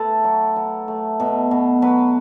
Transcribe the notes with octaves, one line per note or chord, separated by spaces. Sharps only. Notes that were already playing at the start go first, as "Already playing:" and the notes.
Already playing: A3 A4 B4
F#3
F#3
A3
B2
B2
F#3 B4